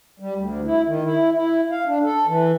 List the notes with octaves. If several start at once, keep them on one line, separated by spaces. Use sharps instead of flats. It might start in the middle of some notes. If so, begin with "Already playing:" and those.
G3
D2
E4
D#3
E4
E4
F5
D4
A4
E3